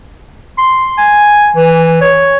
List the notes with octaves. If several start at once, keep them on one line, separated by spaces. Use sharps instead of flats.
C6
G#5
E3
C#5